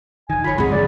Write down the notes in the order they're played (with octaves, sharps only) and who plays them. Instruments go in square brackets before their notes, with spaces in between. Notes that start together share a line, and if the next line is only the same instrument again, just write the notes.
[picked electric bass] E1 D#3 [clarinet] G#5
[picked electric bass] F#1 [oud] F4 C#5 [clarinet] B5
[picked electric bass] C2 G#2 C4 [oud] F#3 G#4 [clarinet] G#3
[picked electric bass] C#2 D3 F3 [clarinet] D5